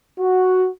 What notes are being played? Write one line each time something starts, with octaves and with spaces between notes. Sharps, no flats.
F#4